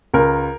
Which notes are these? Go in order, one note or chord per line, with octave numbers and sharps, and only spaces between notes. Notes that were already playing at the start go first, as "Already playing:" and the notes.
C#2 A#4